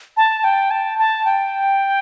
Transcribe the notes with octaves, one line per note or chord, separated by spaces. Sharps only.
A5
G5
A5
A5
G5